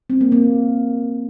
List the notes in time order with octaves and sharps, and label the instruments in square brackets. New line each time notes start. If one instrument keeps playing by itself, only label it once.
[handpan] C4
A#3
A#3